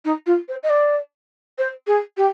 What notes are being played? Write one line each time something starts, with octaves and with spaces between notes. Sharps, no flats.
D#4
F4
C5
D#5
D5
C5
G#4
G4